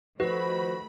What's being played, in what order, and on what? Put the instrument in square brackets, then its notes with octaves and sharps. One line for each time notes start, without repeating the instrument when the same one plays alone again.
[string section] D#3 A3 B5 [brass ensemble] F3 C5 [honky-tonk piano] F#4 [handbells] B4